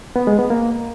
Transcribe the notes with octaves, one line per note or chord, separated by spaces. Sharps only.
B3
G#3
B3
A#3